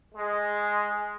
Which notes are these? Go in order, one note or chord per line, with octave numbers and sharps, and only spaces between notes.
G#3